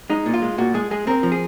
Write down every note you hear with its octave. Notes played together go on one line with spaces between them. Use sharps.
G#3 D#4
A#2
F4
G#3
A#2 F#4
G#3 G#4
G#3 G#4
C4 A#4
F3
G#4